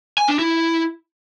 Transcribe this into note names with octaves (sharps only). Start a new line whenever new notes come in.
G#5
D4
E4